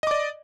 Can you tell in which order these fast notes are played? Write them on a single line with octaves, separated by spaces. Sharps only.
D#5 D6 D5